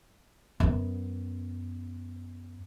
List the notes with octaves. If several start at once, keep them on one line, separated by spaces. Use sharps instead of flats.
F#2 B3